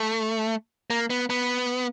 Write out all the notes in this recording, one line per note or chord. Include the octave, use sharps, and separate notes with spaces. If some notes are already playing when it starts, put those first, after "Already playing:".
Already playing: A3
A#3
B3
B3